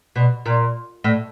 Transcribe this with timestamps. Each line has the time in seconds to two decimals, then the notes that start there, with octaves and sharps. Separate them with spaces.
0.16 B2
0.46 A#2
1.04 A2